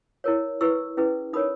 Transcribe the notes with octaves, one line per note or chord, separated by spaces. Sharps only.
E4 A#4 C#5
E4 B4 C#6 E6
C#4 E4 G#4 B4
D#4 A#4 C#5 B5 D#6